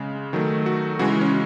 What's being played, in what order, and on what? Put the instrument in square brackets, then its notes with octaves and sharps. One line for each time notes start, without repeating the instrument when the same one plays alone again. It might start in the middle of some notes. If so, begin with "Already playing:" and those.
Already playing: [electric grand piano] C#3 G#3
D#3 F#3 A3
F#4
C#3 E3 G#3 F#4
C#4